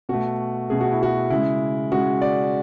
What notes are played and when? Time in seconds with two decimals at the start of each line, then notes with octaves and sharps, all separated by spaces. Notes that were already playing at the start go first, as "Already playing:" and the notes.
0.09 B2 A3 F#4
0.70 B2 A3 G#4
0.81 F#4
0.92 E4
1.03 F#4
1.30 C#3 G#3 E4
1.91 C#3 G#3 F#4
2.22 D5